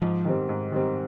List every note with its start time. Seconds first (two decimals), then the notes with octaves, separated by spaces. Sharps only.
0.02 G#2 F3
0.25 D#3 G3 C4
0.49 G#2
0.72 D#3 G3 C4